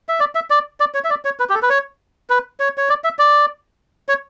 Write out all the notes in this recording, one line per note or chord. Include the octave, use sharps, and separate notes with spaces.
E5
D5
E5
D5
D5
C#5
E5
D5
C#5
B4
G4
A4
B4
C#5
B4
C#5
C#5
D5
E5
D5
C#5